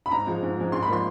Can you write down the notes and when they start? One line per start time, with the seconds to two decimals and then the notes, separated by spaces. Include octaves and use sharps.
0.06 B5
0.11 G#2 A#5
0.27 F3 G#3
0.43 G#2
0.58 F3 G#3
0.72 G#2 C6
0.83 B5
0.88 F3 A#3 C6